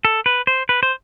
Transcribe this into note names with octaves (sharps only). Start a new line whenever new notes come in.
A4
B4
C5
B4
C5